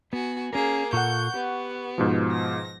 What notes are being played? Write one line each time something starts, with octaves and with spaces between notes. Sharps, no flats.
B3 F#4 G#5
A#3 C#4 G#4 A#4
A#2 F4 A4 F#5 C#6 G6
B3 G4
G#2 B2 F3
A#6